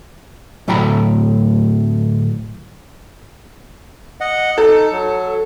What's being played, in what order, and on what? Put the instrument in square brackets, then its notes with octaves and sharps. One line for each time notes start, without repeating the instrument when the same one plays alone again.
[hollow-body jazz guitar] D2 A2 F#3 G5 A#5 B5
[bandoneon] D#5 F#5
[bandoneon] D#4 [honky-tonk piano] A4
[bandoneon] F#3